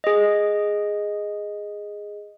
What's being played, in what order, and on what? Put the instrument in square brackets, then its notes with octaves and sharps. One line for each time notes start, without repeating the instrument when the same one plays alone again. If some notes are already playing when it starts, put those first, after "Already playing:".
[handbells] G#4 D#5